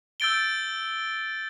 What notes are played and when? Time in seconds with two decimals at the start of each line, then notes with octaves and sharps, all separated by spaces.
0.20 E6 G6 A6 D7 G7